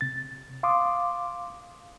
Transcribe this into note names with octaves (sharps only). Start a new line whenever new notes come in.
C3 A6
F5 C6 D6 D#6